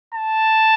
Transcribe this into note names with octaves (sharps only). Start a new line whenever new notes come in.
A5